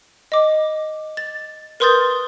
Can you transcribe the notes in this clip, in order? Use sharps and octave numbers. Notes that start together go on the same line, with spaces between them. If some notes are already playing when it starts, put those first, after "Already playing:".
D#5 D6
A6
A#4 B4 C6 D#6 G6 A6